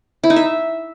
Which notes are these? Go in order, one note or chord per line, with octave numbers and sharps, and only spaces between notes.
E4
D#4
E5